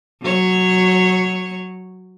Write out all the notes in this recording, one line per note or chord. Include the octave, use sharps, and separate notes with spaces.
F#3 C#5